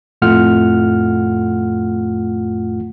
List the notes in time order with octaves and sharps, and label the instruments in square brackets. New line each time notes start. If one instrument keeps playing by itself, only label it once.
[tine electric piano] F2 A2 A3 F4 F#5 F6